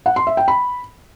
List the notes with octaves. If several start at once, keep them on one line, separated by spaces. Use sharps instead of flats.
F#5
C6
E5
G5
B5